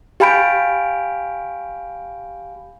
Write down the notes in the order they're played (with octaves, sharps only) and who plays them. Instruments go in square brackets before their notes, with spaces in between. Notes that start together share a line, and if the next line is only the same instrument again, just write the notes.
[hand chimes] G4 F5 G#5 B5 G6 D7